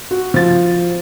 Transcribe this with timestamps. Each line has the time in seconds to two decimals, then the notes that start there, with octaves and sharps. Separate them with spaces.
0.11 F#4
0.34 F3 A6